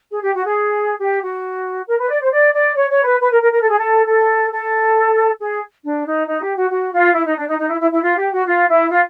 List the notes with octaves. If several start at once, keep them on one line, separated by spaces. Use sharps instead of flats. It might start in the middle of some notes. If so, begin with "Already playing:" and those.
G#4
G4
F#4
G#4
G4
F#4
A#4
B4
D5
C5
D5
D5
C#5
C#5
B4
B4
A#4
A#4
A#4
A4
G#4
A4
A4
A4
G#4
D4
D#4
D#4
G4
F#4
F#4
F4
E4
D#4
D4
D#4
D#4
E4
E4
E4
F4
G4
F#4
F4
E4
F4